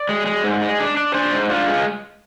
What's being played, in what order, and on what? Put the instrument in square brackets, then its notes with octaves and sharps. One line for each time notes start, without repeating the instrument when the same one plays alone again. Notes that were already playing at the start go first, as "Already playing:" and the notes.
Already playing: [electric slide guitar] D5
G#3
G#3
G#2
G#3
D4
D4
D4 C5
G#2
D4 F4
G#3